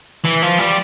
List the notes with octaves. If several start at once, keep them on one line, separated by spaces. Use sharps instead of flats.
E3
F3
G3